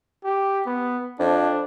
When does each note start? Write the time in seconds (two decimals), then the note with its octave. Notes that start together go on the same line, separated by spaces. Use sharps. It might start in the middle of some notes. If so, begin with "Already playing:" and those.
0.24 G4
0.66 B3
1.19 F2 D4